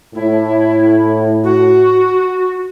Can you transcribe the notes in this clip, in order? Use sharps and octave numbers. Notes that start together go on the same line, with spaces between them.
A2 E4
F#4